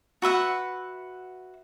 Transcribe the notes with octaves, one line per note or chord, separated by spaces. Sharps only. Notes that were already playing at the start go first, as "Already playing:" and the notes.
F#4 B4 E5 F#5